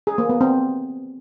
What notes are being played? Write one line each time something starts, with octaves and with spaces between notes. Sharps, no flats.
G#4
A#3
B3
C4